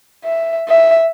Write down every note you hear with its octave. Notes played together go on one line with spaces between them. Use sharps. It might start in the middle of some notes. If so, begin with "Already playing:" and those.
E5
E5